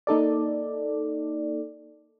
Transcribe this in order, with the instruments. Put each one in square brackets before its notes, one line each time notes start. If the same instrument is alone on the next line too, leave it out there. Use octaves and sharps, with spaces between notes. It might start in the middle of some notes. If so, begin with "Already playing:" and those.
[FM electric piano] A#3 D#4 A4 D5